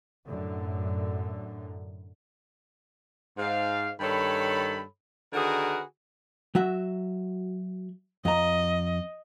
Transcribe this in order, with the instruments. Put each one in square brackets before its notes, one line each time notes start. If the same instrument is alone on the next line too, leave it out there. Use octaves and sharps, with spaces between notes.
[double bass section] F#2 A2 D3
[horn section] G#2 F5
G2 D#3 A4 C#5 B5
D3 D#3 F#4 G#4 A#4 B4
[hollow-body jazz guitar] F#3 F#4 E5
[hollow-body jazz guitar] F2 A#5 [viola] D#5